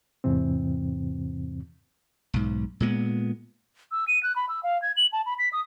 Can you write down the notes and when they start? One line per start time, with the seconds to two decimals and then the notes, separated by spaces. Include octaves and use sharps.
0.24 E2 G#2 C3 E3 C4
2.34 B1 G#2
2.80 A#2 G#3 B3
3.92 E6
4.08 D#7
4.23 F#6
4.36 B5
4.49 E6
4.63 F5
4.82 G#6
4.97 F#7
5.13 A5
5.26 B5
5.39 B6
5.53 D#6